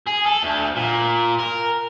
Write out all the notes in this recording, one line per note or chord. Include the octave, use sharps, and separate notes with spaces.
G#4
A4
D2
A#2
A#4